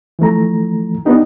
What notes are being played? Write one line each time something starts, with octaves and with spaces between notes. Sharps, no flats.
E3 F3 A3 A#5
A#3 B3 D4 D#4 G4